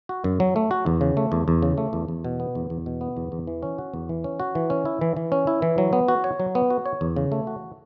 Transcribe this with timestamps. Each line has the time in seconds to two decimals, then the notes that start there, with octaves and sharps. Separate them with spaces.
0.09 F#4
0.24 F#2
0.40 F#3
0.56 A3
0.71 F#4
0.86 E2
1.01 C#3
1.17 A3
1.32 E2
1.48 E2
1.62 C#3
1.78 A3
1.93 E2
2.08 E2
2.25 B2
2.40 B3
2.55 E2
2.70 E2
2.86 B2
3.01 B3
3.17 E2
3.32 E2
3.47 E3
3.63 C#4
3.78 F#4
3.94 E2
4.09 E3
4.24 C#4
4.40 F#4
4.55 E3
4.70 C#4
4.85 E4
5.01 E3
5.17 E3
5.32 C#4
5.47 E4
5.62 E3
5.78 F#3
5.93 B3
6.08 F#4
6.24 C#5
6.40 F#3
6.55 B3
6.70 F#4
6.86 C#5
7.01 E2
7.16 C#3
7.32 A3
7.47 F#4